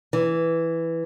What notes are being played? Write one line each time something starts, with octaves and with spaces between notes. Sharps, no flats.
E3